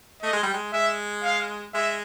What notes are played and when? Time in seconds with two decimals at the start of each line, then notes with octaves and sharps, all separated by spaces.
0.23 A3 D#5
0.33 G#3
0.43 G3
0.53 G#3
0.73 G#3 E5
1.24 F5
1.74 G#3 E5